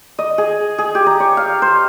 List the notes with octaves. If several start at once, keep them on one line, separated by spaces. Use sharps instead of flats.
D#5
G#4
G#4
G4
A#5
C#5
F5
C5